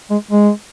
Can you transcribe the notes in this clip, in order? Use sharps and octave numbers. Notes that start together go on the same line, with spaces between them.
G#3
G#3